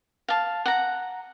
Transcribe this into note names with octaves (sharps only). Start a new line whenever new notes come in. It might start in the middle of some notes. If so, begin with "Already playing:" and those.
F5 A5
F#5 A#5